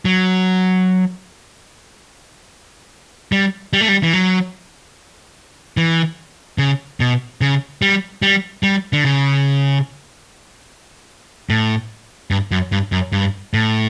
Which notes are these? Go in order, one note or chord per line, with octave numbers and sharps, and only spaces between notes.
F#3
G3
G3
A3
G3
E3
F#3
E3
C#3
B2
C#3
G3
G3
G3
D3
C#3
A2
G2
F#2
G2
F#2
G2
A2